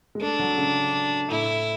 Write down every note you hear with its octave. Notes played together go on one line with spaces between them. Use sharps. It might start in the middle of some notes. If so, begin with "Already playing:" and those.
G#3
A3 D4
F#3
C#3
A2 E4